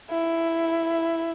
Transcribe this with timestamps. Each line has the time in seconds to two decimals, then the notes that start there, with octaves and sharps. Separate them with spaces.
0.10 E4